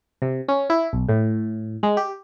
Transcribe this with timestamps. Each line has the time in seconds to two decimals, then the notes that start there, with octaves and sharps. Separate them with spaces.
0.22 C3
0.48 C#4
0.70 E4
0.93 B1
1.09 A2
1.83 G#3
1.97 G4